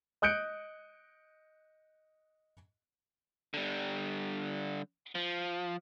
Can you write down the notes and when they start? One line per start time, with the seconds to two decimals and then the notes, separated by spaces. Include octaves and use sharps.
0.22 D#5 D#6 F#6 G6 C#7 D7
3.54 D3 G3
5.15 F3